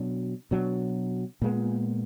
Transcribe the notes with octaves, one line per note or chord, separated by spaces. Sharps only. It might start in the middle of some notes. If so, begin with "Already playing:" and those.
Already playing: B2 F#3 D4
B2 F#3 D4
A#2 G#3 B3